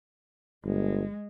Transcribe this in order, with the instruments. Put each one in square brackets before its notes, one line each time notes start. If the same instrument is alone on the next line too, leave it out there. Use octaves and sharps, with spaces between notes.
[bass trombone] G1 [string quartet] G#3